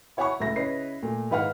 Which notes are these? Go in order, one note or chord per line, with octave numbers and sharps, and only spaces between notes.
E4 C#5 F#5 G#5 B5 C#6
C#2 A2 C#3 E5 A#6
C#3 E4 B4 C#5 D#5 C7
A#2 A3
G#2 D#3 B4 F5 F#5 F6